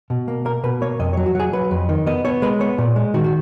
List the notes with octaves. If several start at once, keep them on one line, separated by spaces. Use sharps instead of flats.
B2
A#3
A#3 A#4
B2 B4
A#3 C#5
F2 D#5
C#5
F#3
F#4
F#3 G#4
F#3 B4
F2
D#3
B3 D#5
B3 C#5
G#3 B4
B3 C#5
A#2
G#3
D#3 F#4
F#4